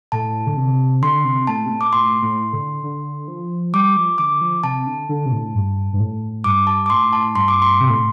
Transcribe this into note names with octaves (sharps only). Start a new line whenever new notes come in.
A2 A5
D3
C3
D3 C6
C3
A2 A5
C3
A2
D6
A2 C6
A2
D3
D3
F3
G3 D6
F3
D3 D6
F3
C3 A5
D3
D3
C3
A2
G2
G2
A2
G2 D6
A5
D6
A2 C6
A5
G2 C6
D6
C6
C3
A2